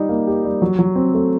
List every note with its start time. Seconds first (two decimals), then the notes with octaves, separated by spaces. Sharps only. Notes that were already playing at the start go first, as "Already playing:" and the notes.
Already playing: G3 D#4 G4
0.09 A#3
0.27 G4
0.45 G3
0.62 F#3
0.79 F#3
0.96 C4
1.14 A3